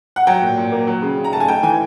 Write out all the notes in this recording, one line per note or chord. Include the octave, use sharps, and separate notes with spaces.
F#5
F#3 G5
A#2
A#2
A#3
F#3
C#3
C#3
A#5
A3 A5
G#5
A3 G5
E3 G#5